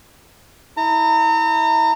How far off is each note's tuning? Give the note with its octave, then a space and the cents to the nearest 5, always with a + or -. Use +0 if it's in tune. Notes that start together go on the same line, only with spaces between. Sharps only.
E4 -30 A#5 -35